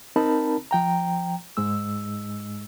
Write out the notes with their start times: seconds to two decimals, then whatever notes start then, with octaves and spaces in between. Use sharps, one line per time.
0.16 C4 D#4 A#4 A5 B5
0.71 F3 G5 A#5
1.57 G#2 G#3 E6